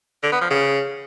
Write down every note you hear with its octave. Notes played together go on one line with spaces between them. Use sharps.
D3
B3
F3
C#3